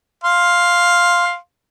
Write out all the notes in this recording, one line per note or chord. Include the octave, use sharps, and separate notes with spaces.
F5 C6